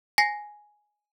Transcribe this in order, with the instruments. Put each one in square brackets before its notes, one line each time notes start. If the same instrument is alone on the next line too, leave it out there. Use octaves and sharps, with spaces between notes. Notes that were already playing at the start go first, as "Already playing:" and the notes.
[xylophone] G#5 A#6 C7